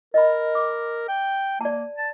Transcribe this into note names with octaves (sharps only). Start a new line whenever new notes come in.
A#4 D#5 B5
D6
G5
A#3 D5 A5
A5